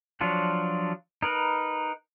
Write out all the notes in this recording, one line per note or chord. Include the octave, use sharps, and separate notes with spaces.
F3 F#3 D4 F4 F#4
D#4 A#4 B4